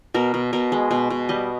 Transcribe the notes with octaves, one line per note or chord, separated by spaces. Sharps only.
B2 A#4
B2
B2 A#4
G#3
B2
B2
G3 D#5